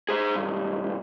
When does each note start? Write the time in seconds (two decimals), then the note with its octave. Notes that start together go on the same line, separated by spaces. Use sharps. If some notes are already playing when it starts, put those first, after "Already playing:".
0.09 G#4 C5
0.34 B1 G2